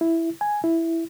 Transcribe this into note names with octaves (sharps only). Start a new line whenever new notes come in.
E4
G#5
E4